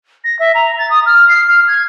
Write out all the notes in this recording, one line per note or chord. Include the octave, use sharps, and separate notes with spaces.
A#6
E5
A#5
A6
D#6
F6
C7
F6
G#6